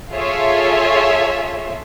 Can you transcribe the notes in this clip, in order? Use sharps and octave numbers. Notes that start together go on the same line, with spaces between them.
F4 G#4 A4 C#5 E5